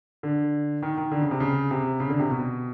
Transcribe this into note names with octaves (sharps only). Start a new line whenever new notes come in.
D3
D#3
D#3
D3
C#3
C3
C#3
C3
C#3
D3
C3
B2